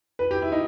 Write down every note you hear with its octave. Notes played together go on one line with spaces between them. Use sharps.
B4
G4
E4
D#4